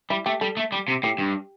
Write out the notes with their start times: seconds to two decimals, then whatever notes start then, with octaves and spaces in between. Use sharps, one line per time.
0.10 G3 E4
0.26 A3 G4
0.41 G3 A4
0.57 A3
0.72 G3
0.88 C3
1.03 A2 G4
1.18 G2